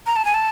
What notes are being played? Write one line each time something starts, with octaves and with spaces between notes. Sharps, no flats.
A#5
A5
G#5
A5